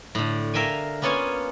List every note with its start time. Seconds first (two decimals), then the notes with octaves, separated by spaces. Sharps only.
0.15 A2 D3
0.54 A#4 E5 F5 G5 G#5
1.02 A#3 B3 C#4 F4 C#5 G#5